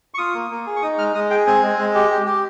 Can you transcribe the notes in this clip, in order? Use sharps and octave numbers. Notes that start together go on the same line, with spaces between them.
C#6
F4 D#6
A#3
A#3
G#4
C#6
D#4 D#6
G#3 F6
G#3 D#6
G#4 G5
C4 G#5
G#3
G#3
G4
G4
G4